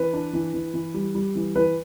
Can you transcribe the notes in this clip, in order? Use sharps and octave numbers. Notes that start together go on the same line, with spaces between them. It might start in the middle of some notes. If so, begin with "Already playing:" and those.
Already playing: E3 B4
D4
E3
E3
E3
G3
G3
E3
E3 B4